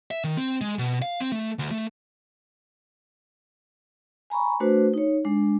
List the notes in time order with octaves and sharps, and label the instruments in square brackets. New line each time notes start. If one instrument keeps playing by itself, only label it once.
[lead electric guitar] E5
D#3
C4
G#3
B2
F5
C4
A3
D2
A3
[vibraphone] G#5 A#5 B5 C#6
A3 D4 F#4 B4 C5
D#4 C#5
G#3 D4